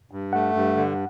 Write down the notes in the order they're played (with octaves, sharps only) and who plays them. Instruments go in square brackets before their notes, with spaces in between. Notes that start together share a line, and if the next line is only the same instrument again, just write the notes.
[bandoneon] G2
[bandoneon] A3 [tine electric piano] F#5
[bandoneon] G2
D3